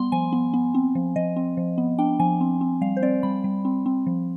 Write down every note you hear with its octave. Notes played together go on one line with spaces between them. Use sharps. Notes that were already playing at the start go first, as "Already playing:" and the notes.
Already playing: G3 B3 C6
F3 G#5
B3
B3
C4
F3
F3 D#5
C4
F3
B3
D4 G5
F3 G#5
C4
C4
G3 F5
C5
C4 D5
G3 B5
G3
C4
C4
F3